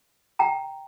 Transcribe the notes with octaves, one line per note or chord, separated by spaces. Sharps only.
G5 A#5